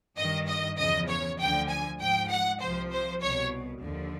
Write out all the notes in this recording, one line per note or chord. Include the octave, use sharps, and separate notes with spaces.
G2 D#3 D#5
D#5
E2 C#3 F3 D#5
C#5
D2 D3 F3 G5
G#5
G#2 F3 G5
F#5
C2 C3 F3 C5
C5
C2 B2 C#5
D#2 D3 F3